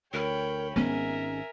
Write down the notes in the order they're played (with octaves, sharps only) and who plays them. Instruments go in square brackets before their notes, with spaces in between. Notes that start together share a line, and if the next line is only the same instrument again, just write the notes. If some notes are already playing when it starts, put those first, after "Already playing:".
[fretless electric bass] D2 [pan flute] A#4 [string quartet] C#5 G5 B5
[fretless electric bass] G#1 G#2 [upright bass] B3 [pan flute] C#4 [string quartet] A#4 E5 G#5